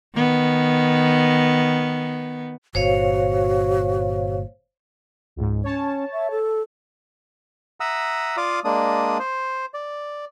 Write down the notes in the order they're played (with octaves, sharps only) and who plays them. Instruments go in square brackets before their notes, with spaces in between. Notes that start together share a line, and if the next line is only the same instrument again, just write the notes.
[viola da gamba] D#3 B3
[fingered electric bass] G1 A#2 [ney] F#4 [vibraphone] C5 C#5 F5
[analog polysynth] C#2 G#2
[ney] C#4 [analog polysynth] C#5 A5
[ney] E5
A4
[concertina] E5 F#5 A#5 D#6 E6
F4 D5 F5 D6 D#6
G#3 A#3 D4 D5 D#6
C5
D5